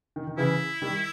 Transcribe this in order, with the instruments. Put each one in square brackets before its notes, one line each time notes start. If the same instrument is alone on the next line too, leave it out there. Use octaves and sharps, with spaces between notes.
[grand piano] D#3
D#3
[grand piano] C#3 E3 [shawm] E4
[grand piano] D#3 G3